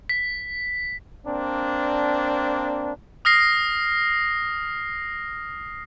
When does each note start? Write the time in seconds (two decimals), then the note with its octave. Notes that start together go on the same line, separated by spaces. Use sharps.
0.09 B6
1.26 A#3 C4 D4
3.25 D#6 F6 A#6 C7